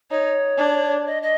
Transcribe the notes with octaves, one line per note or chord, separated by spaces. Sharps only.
D#4 C#5
D4
D#5
D#5